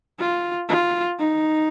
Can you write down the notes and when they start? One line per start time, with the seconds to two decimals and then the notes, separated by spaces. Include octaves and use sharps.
0.19 F4
0.69 F4
1.20 D#4